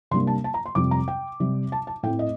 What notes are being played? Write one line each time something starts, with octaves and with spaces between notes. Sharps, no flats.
C3 G3 A#3 D4 C6
A5
A5
A#5
C6
F2 C3 G3 C4 D6
A#5
G5
C3 G3 C4
A5
A5
A2 A3 C4 G5
D#5